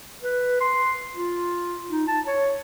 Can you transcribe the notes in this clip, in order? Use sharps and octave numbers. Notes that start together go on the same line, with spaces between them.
B4
C6
F4
D#4
A5
C#5